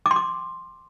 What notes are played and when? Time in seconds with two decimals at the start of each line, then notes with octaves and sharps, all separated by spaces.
0.06 D6
0.11 C6
0.16 D6